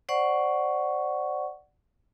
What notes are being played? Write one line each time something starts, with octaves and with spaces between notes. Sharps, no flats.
C5 D5 F#5 C#6